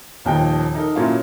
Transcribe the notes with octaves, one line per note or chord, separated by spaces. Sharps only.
D#1 D#2 F3 D#4 G5
D#4 A4 A#4
A#2 F#3 A#3 C#4 E4 F4